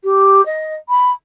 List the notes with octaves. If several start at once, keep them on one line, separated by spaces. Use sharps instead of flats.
G4
D#5
B5